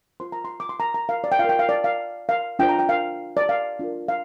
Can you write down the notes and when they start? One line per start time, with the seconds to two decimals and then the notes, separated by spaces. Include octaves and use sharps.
0.20 F4 C5 C6
0.32 A#5
0.45 C6
0.60 D6
0.69 C6
0.80 A#5
0.94 A#5
1.09 F5
1.24 D5
1.32 G5
1.39 F4 F5
1.44 A#4 G5
1.59 F5
1.69 D5
1.84 F5
2.29 F5
2.59 D4 F4 C5 G5
2.69 A#5
2.79 G5
2.89 F5
3.37 D5
3.49 F5
3.79 D4 F4 A#4
4.08 F5